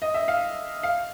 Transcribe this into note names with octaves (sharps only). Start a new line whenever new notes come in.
D#5
E5
F5
F5